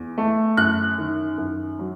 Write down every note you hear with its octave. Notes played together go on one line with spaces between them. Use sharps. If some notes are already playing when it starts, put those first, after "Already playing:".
Already playing: E2
A3
F#2 F#6
D#3
F#2
F#3